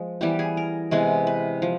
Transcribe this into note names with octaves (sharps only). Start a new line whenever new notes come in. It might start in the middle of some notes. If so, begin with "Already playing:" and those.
Already playing: F3 G#3
E3 G3 B3 G4
G#4
A#4
C3 E3 G#3 B3
B4
F3